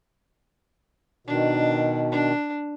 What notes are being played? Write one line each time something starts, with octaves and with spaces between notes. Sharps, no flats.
B2 D#3 D4
D4